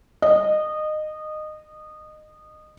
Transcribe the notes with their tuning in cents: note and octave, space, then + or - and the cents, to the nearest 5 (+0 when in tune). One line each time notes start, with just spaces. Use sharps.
D#5 -20